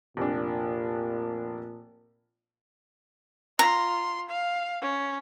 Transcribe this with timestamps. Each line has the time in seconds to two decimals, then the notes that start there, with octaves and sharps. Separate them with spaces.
0.17 F1 A#2 D4
3.59 F4 A#5 C6
4.29 F5
4.82 C#4